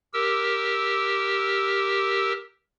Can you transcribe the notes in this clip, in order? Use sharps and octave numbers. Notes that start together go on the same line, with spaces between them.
G4 A#4 E6